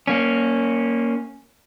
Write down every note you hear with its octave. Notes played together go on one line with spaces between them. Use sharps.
A#3 C#4